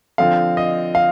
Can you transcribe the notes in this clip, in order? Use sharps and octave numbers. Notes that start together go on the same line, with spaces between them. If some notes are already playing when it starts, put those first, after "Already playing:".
D3 F3 C4 F5
D#5
F5